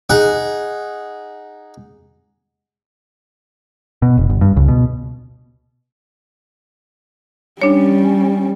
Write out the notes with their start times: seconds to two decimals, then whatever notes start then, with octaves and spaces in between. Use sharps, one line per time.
0.10 D#4 G#4 F#5
4.02 B2
4.17 F1
4.30 G1
4.41 G2
4.56 C#2
4.68 B2
7.62 G3 C#4 D4 C#5